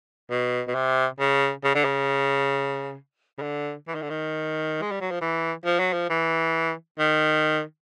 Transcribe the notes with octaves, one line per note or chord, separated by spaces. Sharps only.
B2
B2
C3
C#3
C#3
D3
C#3
C#3
D3
E3
D#3
D3
D#3
G#3
G3
F#3
F3
E3
F3
F#3
F3
E3
D#3